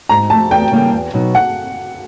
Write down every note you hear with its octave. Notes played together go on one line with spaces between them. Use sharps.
G#2 A#5
F3 A3 A5
E2 G5
C#3 E3 G3 A#3
E2
B2 F#3 B3 D#4
F#5